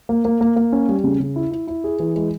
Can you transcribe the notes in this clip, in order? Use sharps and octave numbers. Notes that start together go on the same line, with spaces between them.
A#3
A#3
A#3
A#3
C#4
G3
C#3
C#3
E4
E4
E4
G#4
E3
G#3